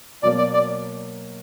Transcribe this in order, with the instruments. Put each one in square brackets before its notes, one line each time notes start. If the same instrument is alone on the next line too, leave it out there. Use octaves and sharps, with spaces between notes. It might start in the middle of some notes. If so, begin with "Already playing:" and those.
[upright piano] B2 F#3 A#3 [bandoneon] D5
[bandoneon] D5
D5